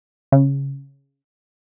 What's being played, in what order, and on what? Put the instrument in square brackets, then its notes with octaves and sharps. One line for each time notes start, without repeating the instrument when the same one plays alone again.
[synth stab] C#3